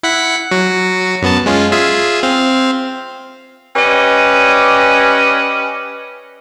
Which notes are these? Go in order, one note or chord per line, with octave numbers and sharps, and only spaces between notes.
E4 F#5 B6
F#3 F#4
F#2 B3 A5
G#3 C#4 F4
F4 G#4 E5
C4 F5
C#4 G4 B4 D5 D#5